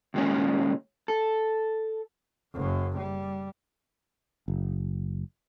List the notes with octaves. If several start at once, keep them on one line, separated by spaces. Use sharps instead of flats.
D#2 A#2 G#3 C#4
A4
F#1 F#2
G3
F#1